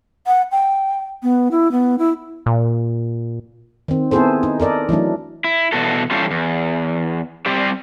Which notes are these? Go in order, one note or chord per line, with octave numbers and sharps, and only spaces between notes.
F#5
G5
B3
E4
B3
E4
A#2
D#3 C4
B3 C4 E4 G#4 A4 C5
D#4
A4 A#4 D5 D#5
E3 F#3 A3 D4
E4
E2 B2 F#4 A4
E3 G3 C#4 F4 G4 A4
E2
G3 C4 G4 D5